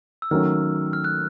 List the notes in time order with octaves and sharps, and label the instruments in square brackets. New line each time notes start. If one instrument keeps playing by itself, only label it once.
[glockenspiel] E6
[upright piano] D#3 F#3 A3 C#4 [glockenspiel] F6
[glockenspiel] F6
F#6